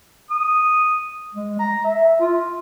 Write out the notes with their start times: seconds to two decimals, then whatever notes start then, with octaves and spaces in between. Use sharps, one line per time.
0.31 D#6
1.34 G#3
1.59 A#5
1.84 E5
2.20 F4